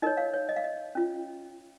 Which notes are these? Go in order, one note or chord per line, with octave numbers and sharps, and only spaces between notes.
D#4 A#4 C#5 D#5
C#5 F5
C#5
D#5
F5
D#5
C#4 F4